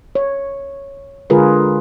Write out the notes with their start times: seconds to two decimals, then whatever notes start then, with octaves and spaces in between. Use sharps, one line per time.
0.15 C#5
1.30 D3 G#3 F4 G#4 A#4 B4